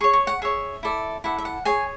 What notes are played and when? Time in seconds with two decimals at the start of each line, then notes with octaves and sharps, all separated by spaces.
0.01 G#4 C#5 C#6
0.13 C#6
0.27 F#5
0.42 G#4 C#5 E5
0.83 E4 A4 D5
1.24 E4 A4 D5 F#5
1.38 E5
1.45 F#5
1.65 G#4 C#5 G#5